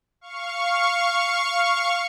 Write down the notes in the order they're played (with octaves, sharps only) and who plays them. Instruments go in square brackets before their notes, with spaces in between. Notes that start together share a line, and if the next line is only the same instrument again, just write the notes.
[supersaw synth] F5 C#6